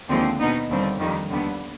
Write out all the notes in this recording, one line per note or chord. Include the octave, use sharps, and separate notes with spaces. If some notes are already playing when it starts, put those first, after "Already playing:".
D#2 D3 F3 G#3 C4
B2 B3 D#4
D#2 D3 G3 C4
F2 D#3 G3
D#2 D3 G3 B3